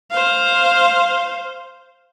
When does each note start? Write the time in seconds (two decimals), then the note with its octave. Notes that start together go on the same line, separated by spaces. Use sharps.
0.11 C5 F5